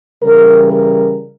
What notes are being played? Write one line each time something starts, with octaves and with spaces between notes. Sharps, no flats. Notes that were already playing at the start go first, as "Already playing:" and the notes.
C#3 E3 G3 A#4
A#4